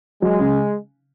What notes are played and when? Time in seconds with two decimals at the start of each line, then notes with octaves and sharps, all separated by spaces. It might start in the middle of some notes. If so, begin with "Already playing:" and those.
0.22 F#3 G#3
0.40 C#3